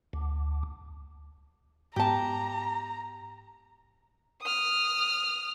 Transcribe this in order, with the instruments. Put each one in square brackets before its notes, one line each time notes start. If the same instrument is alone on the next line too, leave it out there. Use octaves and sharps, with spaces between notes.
[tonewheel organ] D2
[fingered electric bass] G#2 B3 [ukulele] G4 A5 [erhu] A#5
[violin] D#6 F6